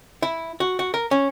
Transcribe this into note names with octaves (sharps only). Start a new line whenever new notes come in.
E4
F#4
F#4
A#4
C#4